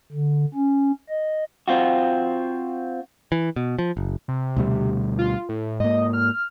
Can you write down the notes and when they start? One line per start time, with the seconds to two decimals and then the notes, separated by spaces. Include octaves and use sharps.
0.12 D3
0.55 C#4
1.09 D#5
1.68 C4 F4 F#4
3.32 E3
3.56 B2
3.79 F3
3.97 F#1
4.28 C3
4.57 D2 B2 G3
5.19 F4
5.49 A2
5.80 G#2 A#3 D#5
6.13 F6